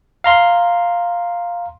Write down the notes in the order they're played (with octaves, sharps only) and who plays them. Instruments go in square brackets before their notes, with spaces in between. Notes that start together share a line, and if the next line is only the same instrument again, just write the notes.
[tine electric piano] F5 A#5 C6